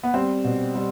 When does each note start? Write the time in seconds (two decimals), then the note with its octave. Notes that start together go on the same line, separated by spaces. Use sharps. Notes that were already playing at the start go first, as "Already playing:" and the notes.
0.03 B3
0.14 G3 C4
0.44 B2
0.75 G3